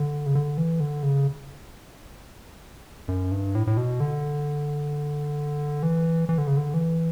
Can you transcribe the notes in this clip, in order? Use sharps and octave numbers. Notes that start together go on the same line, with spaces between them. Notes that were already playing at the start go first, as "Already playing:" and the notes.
Already playing: D3
C#3
D3
E3
D3
C#3
F#2
G2
A2
A2
B2
D3
E3
E3
D3
C#3
D3
E3